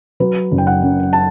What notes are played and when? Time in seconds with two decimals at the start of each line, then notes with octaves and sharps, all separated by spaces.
0.20 F#3 B4
0.51 F#1
0.58 G5
0.67 F#5
0.82 F#2
1.13 A5